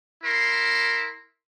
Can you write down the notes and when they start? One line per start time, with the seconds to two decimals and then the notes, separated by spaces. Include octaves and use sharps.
0.23 E4 A#4 C6